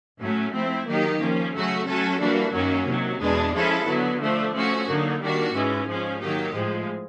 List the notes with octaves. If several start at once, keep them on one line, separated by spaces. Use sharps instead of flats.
A2 F#3 A3 C#4
F3 A3 C4 E4
D#3 F#3 A#3 D#4 G4
F3 A#3 C#4
C#3 F#3 A3 C#4 F#4
F#3 A3 C#4 F#4 A4
E3 G3 A#3 D4 F#4
F#2 D#3 F#3 A#3 C#4
C3 D#3 F#3
E2 B2 G#3 B3 D4
F3 G#3 C#4 E4 A4
D3 F#3 B3
F3 A3 D4
F3 A3 C#4 F#4
D3 F#3 A#3 D#4
D#3 G3 A#3 D4 F#4
G#2 E3 G#3 C#4
F3 G#3 C#4
D#3 F#3 A#3 D#4 G4
A2 F3 G#3